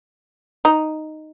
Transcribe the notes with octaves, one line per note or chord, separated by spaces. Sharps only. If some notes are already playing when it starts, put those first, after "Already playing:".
D#4